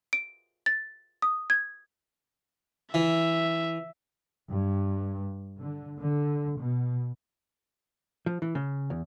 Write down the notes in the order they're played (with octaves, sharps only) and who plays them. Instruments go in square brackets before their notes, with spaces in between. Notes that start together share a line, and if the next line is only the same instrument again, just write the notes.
[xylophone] D7
A6
D#6
G#6
[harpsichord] E3 [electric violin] E5
[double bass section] G2
D3
D3
B2
[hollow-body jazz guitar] F3
E3
C#3
E2